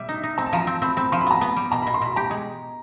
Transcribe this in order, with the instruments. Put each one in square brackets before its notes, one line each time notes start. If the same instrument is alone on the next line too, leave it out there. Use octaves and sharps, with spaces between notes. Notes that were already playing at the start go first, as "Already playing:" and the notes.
Already playing: [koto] B2 G3 [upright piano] E5
[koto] D#4
D#4
[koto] C4 [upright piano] A#5
[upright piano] A5
[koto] F3 [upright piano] A#5
[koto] C4
[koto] C4 [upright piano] B5
[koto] C4 [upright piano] B5
[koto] F3 [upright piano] C6
[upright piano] B5
[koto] B3 [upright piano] A#5
[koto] B3 [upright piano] B5
[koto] G3
[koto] B2 [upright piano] A#5
[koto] B2 [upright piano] B5
[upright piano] C6
[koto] B2 [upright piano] B5
[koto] G4 [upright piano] A#5
[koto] G#3